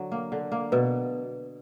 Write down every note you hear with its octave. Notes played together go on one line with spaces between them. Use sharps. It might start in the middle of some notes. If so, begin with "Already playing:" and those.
Already playing: D3 F#3 D4
A#3
D3
A#3
B2 B4